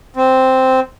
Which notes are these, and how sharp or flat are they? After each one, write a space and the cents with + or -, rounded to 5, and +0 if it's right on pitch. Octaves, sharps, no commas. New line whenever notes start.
C4 -5